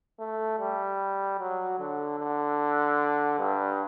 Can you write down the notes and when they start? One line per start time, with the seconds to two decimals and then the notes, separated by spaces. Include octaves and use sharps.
0.20 A3
0.60 G3
1.39 F#3
1.79 D3
2.20 D3
3.39 G2